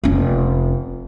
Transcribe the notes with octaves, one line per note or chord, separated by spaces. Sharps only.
F1 C#4